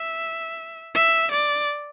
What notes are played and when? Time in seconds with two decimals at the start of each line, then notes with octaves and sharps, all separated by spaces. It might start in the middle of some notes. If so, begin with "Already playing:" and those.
Already playing: E5
0.95 E5
1.32 D5